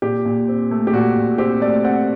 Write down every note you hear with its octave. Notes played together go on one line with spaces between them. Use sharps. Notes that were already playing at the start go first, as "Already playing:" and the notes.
A#2 G4
A#2
C4
A3
G4
A#2 F#4
A#2
C4 G4
A3 D5
C4 F#5